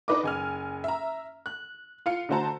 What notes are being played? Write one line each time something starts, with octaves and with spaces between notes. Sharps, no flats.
D4 D#4 B4 D#5 D6
F#1 G#5 F6
E5 A#5
F#6
F4 F5 C#7
D3 A3 F#4 C5 A5 A#5